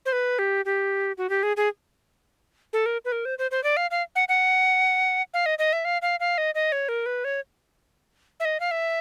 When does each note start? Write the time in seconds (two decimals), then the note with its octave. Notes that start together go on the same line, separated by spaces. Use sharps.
0.06 C5
0.12 B4
0.39 G4
0.65 G4
1.18 F#4
1.29 G4
1.43 G#4
1.57 G#4
2.73 A4
2.86 A#4
3.05 B4
3.12 A#4
3.25 C5
3.39 C5
3.51 C5
3.64 D5
3.77 F5
3.91 F5
4.16 F#5
4.29 F#5
5.34 F5
5.46 D#5
5.59 D#5
5.73 E5
5.85 F5
6.02 F5
6.20 F5
6.38 D#5
6.55 D#5
6.72 C#5
6.89 A#4
7.06 B4
7.24 C#5
8.40 E5
8.45 D#5
8.60 F5
8.71 E5